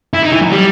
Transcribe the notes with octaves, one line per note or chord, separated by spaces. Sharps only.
E4
D#4
E3
F#3
G3